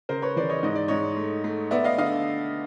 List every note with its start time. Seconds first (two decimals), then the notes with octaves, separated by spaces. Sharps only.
0.09 C#3 A#4 C5
0.22 B4 C#5
0.36 E3 C5 D5
0.49 C#5 D#5
0.63 G#2 D#5
0.75 D5
0.88 G#2 C#5 D#5
1.17 A3
1.44 A3
1.71 B3 D5 E5
1.84 D#5 F5
1.98 D3 D#5 F5